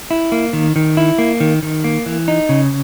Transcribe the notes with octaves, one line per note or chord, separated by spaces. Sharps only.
E4
A#3
D#3
D#3
E4
A#3
D#3
D#3
A#3
E3
D#4
C#3